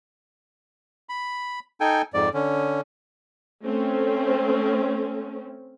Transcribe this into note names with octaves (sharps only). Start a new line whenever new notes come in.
B5
D#4 A4 G5 G#5
F2 G#2 D5
D3 C#4
A3 C4 C#4